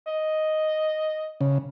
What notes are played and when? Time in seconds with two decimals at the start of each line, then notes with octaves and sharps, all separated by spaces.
0.07 D#5
1.41 C#3